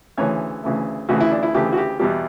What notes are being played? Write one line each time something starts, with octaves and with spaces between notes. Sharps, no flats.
D2 C#3 E3 A3 C#5
D2 C#3 E3 A3
D2 C#3 E3 A3 F#4
E4
D4
E4
D2 C#3 E3 A3 G4
F#4
G4
E2 B2 G3 G4